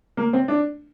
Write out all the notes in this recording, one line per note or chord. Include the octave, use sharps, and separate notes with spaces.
A#3
C4
D4